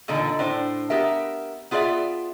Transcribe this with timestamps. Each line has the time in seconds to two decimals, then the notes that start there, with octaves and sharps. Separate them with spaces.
0.08 E2 A#2 D3 D4 D#4
0.39 A2 D4 C5
0.90 B3 G4 A#4 E5
1.71 B3 F4 G#4 A#4 D5 E5